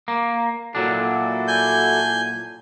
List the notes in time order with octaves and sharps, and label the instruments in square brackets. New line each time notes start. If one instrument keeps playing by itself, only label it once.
[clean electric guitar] A#3
[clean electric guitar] A#2 F#3 D4 [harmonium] E4 F#4 A4
[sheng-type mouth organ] G#5 G6